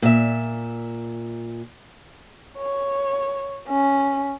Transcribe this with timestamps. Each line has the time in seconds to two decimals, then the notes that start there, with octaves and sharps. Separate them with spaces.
0.02 A#2 E5
2.58 C#5
3.68 C#4